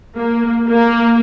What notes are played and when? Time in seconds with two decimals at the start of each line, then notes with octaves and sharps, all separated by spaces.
0.17 A#3
0.69 A#3